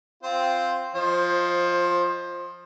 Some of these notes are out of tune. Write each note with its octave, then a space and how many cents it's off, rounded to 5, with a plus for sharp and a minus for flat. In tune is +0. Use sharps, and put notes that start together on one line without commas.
C4 +0 F4 +0 C5 +0
F3 +0 C5 +20 D#5 +0